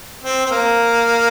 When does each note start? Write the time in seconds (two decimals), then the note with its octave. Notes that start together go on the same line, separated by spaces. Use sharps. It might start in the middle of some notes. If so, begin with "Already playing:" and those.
0.24 C4
0.46 C4
0.51 A#3